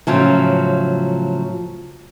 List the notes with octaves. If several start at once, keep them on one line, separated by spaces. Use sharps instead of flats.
A2 C#3 F3 F#3